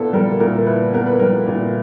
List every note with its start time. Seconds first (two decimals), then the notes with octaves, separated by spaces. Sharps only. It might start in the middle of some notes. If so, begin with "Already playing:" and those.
Already playing: A#2 B3 E4 A4
0.13 G3 A#4
0.40 A#2 A#4
0.66 E4 B4
0.93 B3 A#4
1.07 B4
1.19 G3 A#4
1.48 A#2